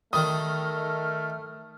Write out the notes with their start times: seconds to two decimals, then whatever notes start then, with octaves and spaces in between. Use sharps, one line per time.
0.13 D#3 G3 A3 D#4 A#4 D#6 F6